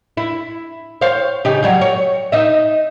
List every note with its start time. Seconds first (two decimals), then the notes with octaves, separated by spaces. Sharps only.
0.17 E4
1.01 C5 C#5 F5
1.45 C#3 D#4 G4
1.63 F#3 G3 F4
1.81 C#5
2.32 D#4 D#5 E5